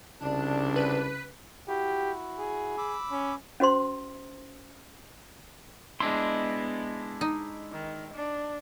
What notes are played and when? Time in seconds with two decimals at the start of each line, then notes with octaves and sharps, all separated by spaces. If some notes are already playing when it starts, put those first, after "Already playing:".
0.22 C2 C#3 D4
0.76 B4
1.68 E4 F#4 G4
2.39 G#4
2.78 B5 D6 E6
3.11 C#4
3.60 C#4 F#4 C5 C6
6.00 G#3 B3 D4 E4 D#5 C6
7.21 D#4
7.72 D#3
8.14 D4